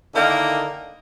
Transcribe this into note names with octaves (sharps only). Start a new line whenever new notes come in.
D3 D#3 A#3 D#4 E4 A#4